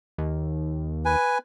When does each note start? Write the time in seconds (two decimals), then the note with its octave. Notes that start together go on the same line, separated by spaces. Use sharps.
0.18 D#2
1.05 B4 G#5